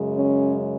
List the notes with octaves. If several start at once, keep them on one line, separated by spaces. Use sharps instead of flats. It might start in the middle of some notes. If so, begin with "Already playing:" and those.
Already playing: F#2 C#3 G#3
C#4